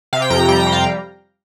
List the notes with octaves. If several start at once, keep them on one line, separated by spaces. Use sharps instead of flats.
C3 F5
G5
F2 A#5
G5
G3 A#5
G5
G3
F5